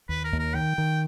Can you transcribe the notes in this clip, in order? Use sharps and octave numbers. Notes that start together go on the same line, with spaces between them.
D#2 B4
A#4
D#2
A#4
D#3 G5
D#3